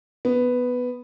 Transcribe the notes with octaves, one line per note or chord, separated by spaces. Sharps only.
B3